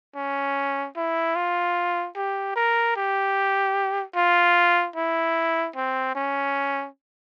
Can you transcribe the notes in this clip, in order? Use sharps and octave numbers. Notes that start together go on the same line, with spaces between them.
C#4
E4
F4
G4
A#4
G4
F4
E4
C4
C#4